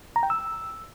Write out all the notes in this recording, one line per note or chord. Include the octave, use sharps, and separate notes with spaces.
A#5
G5
E6